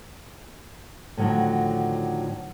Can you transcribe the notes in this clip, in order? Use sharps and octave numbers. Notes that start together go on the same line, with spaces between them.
A2 D3 D#3 F3 F#3